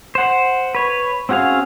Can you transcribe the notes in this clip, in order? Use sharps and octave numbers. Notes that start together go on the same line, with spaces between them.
C5 F#5
B4 C#5
C4 C#4 F#4 G#4 F5